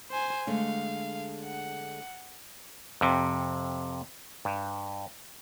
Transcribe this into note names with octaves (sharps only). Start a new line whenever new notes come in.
C5 G#5
D3 G#3 A3 F5
F#5
F2 C3
G2